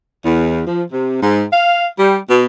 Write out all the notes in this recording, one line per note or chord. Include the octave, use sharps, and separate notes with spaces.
E2
F3
C3
G#2
F5
G3
B2